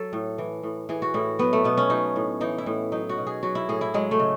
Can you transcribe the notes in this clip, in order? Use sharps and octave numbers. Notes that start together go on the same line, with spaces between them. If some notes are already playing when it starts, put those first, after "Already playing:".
Already playing: F#3 A4
A2
E3
A2
E3 G#4
F#4
A2 E4
F#3 B3
A3
B2 B3
C#4
F#3 D#4
A2
E3 D#4
E4
A2
F#3 D#4
F#4
B2
G#4
F#3 F#4
E4
A2 G#4
E4
F#3 G#3
A3
C#3